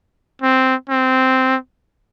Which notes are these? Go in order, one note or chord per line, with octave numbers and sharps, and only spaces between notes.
C4
C4